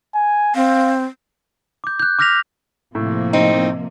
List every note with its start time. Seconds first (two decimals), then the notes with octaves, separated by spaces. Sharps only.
0.15 G#5
0.55 C4 F5
1.84 D6 G6
2.00 F#6 G6
2.19 D6 F6 G6 A#6 B6 F7
2.95 A2 C3 F3 A#3
3.33 C4 D#4